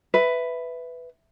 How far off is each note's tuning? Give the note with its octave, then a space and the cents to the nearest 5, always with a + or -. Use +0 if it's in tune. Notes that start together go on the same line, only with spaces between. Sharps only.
B4 +10 E5 +0